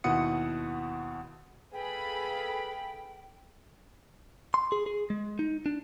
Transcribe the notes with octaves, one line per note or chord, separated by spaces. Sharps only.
D#2 B2 E4 F#5 D#6 C#7
G#4 A4 B4 F5 G5 B5
C6
G#4
G#4
G#3
D#4
D4